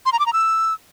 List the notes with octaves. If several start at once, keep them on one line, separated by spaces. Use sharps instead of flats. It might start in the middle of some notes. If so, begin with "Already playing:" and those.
C6
A#5
D6
A#5
E6